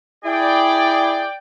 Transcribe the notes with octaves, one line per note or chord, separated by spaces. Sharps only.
E4 G#4 D5 G5